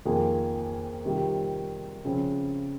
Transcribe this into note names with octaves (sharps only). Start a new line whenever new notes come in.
F2 D#3 A#3 F4 G#4
C3 D#3 G3 C4 F4
C#3 F3 C4